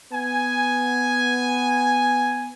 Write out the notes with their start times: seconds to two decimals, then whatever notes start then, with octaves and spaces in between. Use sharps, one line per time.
0.13 B3 G#5